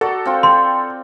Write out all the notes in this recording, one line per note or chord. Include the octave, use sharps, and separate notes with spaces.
F#4 A4 D5 A#5
C4 F4 G5
C6